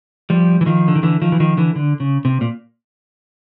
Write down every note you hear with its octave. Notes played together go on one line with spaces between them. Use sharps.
F3 G3
E3
D#3 F3
D3
D#3
D3 E3
D#3 F3
E3
D#3 F3
D3 E3
D3
C#3
C3
A#2